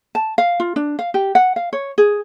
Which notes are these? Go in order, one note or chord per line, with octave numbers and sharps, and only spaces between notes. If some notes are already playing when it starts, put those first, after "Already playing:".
A5
F5
F4
D4
F5
G4
F#5
F5
C#5
G#4